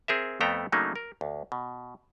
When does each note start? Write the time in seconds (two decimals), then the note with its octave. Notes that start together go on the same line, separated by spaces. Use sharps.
0.08 C4 G#4 A#4 E5
0.40 F2 A3 B3 A4 G5 A#5
0.72 C#3 F#3 A3 A#3 D4 D#4
0.96 A#4
1.21 D2
1.52 B2